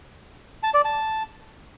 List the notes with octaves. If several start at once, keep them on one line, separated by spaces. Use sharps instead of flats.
A5
D5
A5